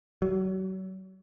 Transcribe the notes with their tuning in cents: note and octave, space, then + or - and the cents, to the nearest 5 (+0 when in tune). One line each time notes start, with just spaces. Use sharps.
F#3 +35